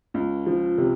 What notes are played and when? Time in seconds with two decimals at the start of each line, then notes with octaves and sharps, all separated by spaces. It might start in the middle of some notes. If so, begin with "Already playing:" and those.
0.14 C#2
0.46 F3
0.78 C3